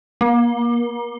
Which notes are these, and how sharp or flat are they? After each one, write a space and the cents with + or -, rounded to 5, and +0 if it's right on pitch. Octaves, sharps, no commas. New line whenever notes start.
A#3 +35